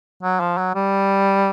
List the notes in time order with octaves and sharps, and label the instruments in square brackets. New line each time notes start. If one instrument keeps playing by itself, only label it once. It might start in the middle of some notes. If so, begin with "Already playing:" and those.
[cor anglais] F#3
F3
F#3
G3